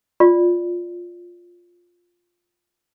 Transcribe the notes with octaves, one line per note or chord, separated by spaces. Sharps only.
F4 D5